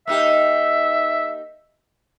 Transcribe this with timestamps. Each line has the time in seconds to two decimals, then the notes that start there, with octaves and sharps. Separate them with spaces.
0.07 A#3 D#4 G4 E5